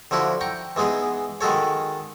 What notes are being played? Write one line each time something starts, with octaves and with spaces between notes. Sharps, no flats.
D3 F3 E4 F#4
G5 A#5 C#6
E3 G#3 B3 D#4 G#4
D#3 G#3 F#4 A4 C#5